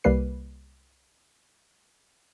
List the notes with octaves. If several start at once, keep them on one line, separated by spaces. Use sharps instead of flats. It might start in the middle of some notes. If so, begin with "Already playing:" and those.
C2 G3 A#3 B4 C7